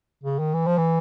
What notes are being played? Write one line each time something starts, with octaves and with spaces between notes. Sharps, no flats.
C#3
D#3
E3
F3
E3